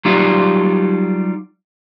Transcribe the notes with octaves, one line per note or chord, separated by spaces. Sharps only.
F#3 G3 D#4 F4 G4 D5